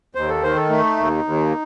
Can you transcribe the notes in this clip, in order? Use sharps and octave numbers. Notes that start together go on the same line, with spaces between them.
D#2 C5
A4
D#3 C5
A4
A3 D#4
D#2
D#2